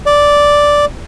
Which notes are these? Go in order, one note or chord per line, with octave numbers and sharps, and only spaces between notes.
D5